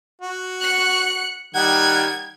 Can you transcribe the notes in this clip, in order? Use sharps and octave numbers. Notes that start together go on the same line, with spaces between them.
F#4
F#6 C#7
D#3 G3 F#5 G#6